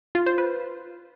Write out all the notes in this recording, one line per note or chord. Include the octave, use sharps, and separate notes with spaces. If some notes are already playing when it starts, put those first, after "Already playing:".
F4
C5
B4